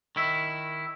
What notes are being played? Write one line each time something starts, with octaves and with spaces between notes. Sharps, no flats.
D#3 E4